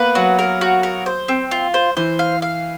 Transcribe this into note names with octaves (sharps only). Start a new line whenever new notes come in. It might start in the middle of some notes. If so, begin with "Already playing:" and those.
Already playing: A#3 B3 B4
F#3 F#4
A#4
F#4
A#4
C5
C4
F4
C5
E3 C5
F5
F5